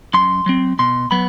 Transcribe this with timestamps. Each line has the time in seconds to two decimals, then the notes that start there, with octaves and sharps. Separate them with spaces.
0.14 F#2 C6
0.46 F#3 C4
0.79 B2 C6
1.11 F#3 B3 B5